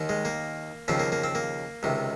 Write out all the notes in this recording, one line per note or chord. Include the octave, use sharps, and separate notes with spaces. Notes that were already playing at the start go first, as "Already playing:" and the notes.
Already playing: D#2 D#3
G#3
A#3
D#2 C#3 F3 C4
A#3
A#3
C4
A#3
C#2 C3 D#3